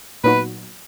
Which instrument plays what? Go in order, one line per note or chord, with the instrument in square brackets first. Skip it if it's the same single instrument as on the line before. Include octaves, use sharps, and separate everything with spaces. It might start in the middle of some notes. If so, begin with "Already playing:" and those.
[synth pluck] A#2 F#3 B3 D#4 F#4 [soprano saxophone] B4